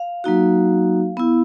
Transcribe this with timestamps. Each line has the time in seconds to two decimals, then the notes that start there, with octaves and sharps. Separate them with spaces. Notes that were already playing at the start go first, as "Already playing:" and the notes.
Already playing: F5
0.24 F#3 A#3 D#4 F#4
1.17 B3 E4